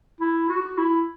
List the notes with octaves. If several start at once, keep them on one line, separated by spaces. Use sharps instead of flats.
E4
F#4
E4